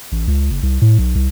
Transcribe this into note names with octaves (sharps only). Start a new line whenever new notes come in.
A1
C#2
F#1
C2
A2
B1
C2